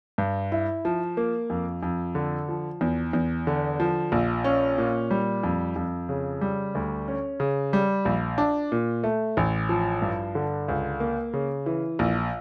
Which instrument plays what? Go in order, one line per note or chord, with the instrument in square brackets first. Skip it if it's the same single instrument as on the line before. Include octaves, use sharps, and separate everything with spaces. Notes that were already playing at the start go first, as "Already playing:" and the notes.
[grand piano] G2
E4
F3
A#3
F2
F2
D3
F3
E2
E2
D3
F3
A#1
C#4
A#2
G3
F2
F2
C#3
G3
D2
C#4
C#3
G3
A#1
D4
A#2
A3
A1
F3
G2
D3
C#2
A#3
C#3
E3
A#1